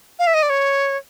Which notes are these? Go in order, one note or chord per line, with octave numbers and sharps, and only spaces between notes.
F5
E5
D#5
D5
C#5